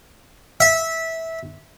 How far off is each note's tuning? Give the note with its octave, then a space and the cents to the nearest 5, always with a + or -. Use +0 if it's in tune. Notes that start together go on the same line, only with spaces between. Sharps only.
E5 -15